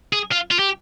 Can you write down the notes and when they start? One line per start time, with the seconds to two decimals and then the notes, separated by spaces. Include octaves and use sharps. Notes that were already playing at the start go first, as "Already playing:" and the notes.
0.13 G#4
0.32 F4
0.51 F4
0.59 G4